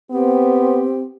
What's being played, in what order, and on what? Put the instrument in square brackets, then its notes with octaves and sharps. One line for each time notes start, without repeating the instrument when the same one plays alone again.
[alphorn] B3 [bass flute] C4 [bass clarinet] G4